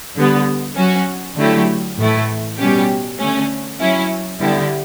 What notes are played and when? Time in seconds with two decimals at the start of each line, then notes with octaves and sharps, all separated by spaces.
0.16 D3 G3 B3
0.76 F#3 C#4 F#4
1.36 D3 F#3 A3 E4 G4
1.98 A2 E3 A3 E4
2.59 B2 G3 C#4 G4
3.19 D3 A3 C#4
3.80 F#3 C#4 E4
4.40 D3 G3 B3 E4 G4